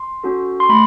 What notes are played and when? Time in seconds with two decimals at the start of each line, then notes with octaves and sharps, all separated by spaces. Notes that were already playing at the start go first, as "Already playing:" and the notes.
Already playing: C6
0.24 C#4 F#4 A4
0.60 C6
0.69 A3 B5